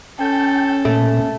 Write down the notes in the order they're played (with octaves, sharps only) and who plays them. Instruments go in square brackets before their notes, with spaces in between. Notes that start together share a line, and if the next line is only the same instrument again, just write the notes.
[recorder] C#4 [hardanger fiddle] A4 [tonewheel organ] G5
[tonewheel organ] A#2 [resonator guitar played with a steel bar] A3